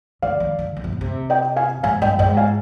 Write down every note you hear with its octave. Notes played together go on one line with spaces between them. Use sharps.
D3 D5 F5
D#3
D3
D3
C3
B2
C3
D#5 G5
F5 G#5
G#2 F5 G#5
G2 D#5 G5
G#2 D#5 G5
F5 G#5